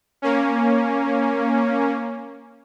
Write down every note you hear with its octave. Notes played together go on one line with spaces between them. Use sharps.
A#3 C#4